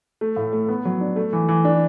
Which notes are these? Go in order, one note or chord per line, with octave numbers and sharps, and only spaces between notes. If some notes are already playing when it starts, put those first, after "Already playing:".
A3
A2
A3
B3
F#3
D4
A3
E3
E3
D4